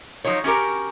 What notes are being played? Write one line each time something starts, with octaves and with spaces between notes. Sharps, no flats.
F3 F#3 D#4 C#5
C#4 F#4 G4 A#4